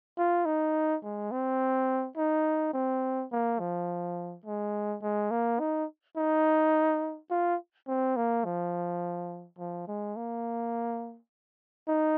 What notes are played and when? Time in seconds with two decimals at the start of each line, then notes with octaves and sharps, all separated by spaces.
0.17 F4
0.45 D#4
1.03 G#3
1.31 C4
2.17 D#4
2.73 C4
3.32 A#3
3.60 F3
4.45 G#3
5.02 G#3
5.31 A#3
5.60 D#4
6.16 D#4
7.30 F4
7.88 C4
8.16 A#3
8.45 F3
9.58 F3
9.88 G#3
10.16 A#3
11.88 D#4